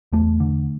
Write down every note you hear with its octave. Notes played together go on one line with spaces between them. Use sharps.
E2 A3
D3